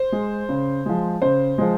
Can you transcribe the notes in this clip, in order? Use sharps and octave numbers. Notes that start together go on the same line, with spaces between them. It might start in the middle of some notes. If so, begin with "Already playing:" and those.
Already playing: C5
G#3
C#3
F3 G#3
C#3 C5
F3 G#3